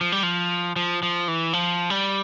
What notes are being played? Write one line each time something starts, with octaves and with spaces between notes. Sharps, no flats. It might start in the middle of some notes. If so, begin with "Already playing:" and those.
F3
G3
F3
F3
F3
E3
F3
G3